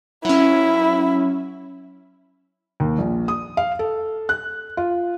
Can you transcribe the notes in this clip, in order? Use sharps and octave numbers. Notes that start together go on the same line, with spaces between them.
F#3 C#4 E4
D#2
A#1
D#6
F5
A4
F#6
F4